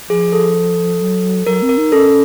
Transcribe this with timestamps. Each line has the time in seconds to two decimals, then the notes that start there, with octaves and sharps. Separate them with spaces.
0.09 F3 G#4
0.33 A4
1.01 F#3
1.47 F#3 A#4
1.62 C4
1.69 A#4
1.78 D#4
1.92 C#4 A4